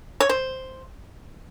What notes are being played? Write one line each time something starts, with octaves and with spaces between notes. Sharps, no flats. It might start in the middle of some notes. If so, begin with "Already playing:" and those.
C#5
C5